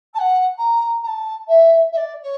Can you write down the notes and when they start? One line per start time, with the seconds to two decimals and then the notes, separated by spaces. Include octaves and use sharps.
0.14 A5
0.18 F#5
0.58 A#5
1.03 A#5
1.06 A5
1.47 E5
1.92 E5
1.96 D5
2.22 C#5